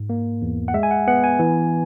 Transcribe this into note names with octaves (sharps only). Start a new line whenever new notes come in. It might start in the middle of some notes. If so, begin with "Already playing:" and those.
Already playing: G#2
A#3
E2
F#5
G#3 E5
G#5
F#5
B3 F#5
G#5
E3